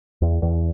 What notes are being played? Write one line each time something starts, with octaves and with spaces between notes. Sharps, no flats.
E2
E2